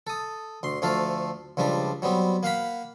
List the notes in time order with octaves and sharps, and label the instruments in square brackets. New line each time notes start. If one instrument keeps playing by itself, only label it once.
[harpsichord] A4 D#6
D2 C6
D2 F3 A3 A4 F5
C#2 F3 G3 D4
F#3 G3 B3 C4
A#3 F5 F#5 B5